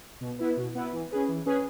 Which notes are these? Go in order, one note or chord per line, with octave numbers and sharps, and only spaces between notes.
B2
B3 E4 B4
B2
B3 E4 B4
E3
C#4 G#4 B4
E3
C#4 G#4 B4